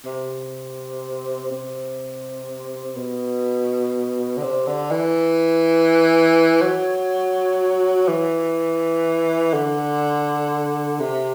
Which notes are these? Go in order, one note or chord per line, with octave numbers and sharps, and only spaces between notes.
C3
C3
B2
D3
C3
D3
E3
F#3
E3
D3
C3